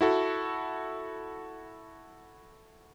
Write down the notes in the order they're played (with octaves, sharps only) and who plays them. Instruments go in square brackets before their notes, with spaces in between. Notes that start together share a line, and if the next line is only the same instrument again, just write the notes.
[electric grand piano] E4 F#4 A4